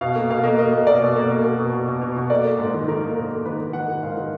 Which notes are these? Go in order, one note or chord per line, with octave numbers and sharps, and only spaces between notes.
B2 F5
A#3
B2 F5
A#3 D#5
A#3 D#5
A#3
B2 D5
B2
A#3
A#3
B2
B2
B2
B2
B2
B2
A#3 D5
A#3
G#2
D#3
D#3 A#4
A#3
G#2
A#3
D#3 B4
D#3
D#3 F#5
D#3
G#2 F5
D#3